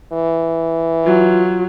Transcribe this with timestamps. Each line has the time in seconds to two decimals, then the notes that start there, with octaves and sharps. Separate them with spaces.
0.13 E3
1.05 F#3 F4